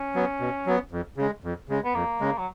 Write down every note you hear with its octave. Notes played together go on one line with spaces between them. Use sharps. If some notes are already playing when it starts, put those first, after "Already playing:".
Already playing: C#4
F#3 B3
B2
F#3 B3
F2
C#3 G#3
F2
C#3 G#3
B3
F2 A#3
C#3 G#3
F#3